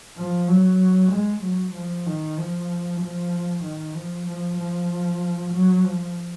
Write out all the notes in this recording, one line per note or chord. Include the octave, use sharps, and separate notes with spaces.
F3
F#3
G#3
F#3
F3
D#3
F3
F3
D#3
F3
F3
F3
F#3
F3